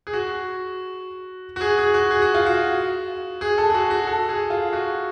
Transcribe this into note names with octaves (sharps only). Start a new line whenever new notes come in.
G#4
F#4
F#4
G#4
G#4
F#4
G#4
F#4
F4
F#4
G#4
A4
G#4
F#4
F#4
A4
G#4
F4
F#4